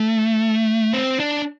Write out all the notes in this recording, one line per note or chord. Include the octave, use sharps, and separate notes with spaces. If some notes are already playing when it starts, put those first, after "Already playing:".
Already playing: A3
C4
D4